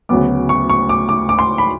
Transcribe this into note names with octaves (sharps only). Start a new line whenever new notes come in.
D2 C#3 F#3 B3 D6
C#6
C#6
D6
D6
D6
C6
B5